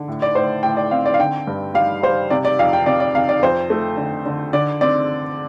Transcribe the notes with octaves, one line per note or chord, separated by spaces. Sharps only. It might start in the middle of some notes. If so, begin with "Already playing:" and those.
Already playing: D3
A2
D5
A2 C5
A2 G5
D5
C4 F5
D5
F5
D3 G5
G2
G3 F5
G3 C5
C3 D5
D5
F2 F5
G5
C3 D5
D5
C3 F5
D5
F2 C5
A3
D3
D3
D3 D5
C4 D5